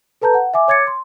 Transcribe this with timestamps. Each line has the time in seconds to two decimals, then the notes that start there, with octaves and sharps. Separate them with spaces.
0.22 A4 B4 A5 A#5 G6
0.34 F#5
0.54 E5 G#5 D6
0.68 C#5 D6 G#6 A6 C#7
0.87 C6